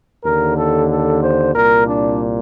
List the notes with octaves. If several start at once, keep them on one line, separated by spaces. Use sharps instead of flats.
D#2 D3 A#4
A4
A4
C5
C2 A#2 A#4
D4